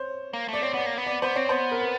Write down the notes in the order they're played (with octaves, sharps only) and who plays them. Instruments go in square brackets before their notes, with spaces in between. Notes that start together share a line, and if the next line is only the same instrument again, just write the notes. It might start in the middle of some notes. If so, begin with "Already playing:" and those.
Already playing: [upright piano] C5 C#5
[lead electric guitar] A#3
[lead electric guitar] A3 [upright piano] D5
[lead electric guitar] C4 [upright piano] C#5
[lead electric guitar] B3 [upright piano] D5
[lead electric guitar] A#3
B3
[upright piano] D5
[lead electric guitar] B3 [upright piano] C5
[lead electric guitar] C4 [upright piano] C#5
[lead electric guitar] B3 [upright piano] C5
[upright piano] A#4
B4